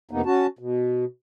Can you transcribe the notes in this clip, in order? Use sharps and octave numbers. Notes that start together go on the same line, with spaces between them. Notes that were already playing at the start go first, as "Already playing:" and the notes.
F2 C3 A#3 B3 D#4
C#4 F#4 A5
B2